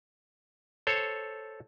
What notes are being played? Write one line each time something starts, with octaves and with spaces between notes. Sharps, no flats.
A4 C5 C#5